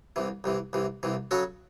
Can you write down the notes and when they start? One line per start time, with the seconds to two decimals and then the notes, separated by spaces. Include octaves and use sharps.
0.16 C2 C3 E3
0.44 C2 C3 E3
0.73 C2 C3 E3
1.03 C2 C3 E3
1.31 C#3 F#3 C#4 F#4 A4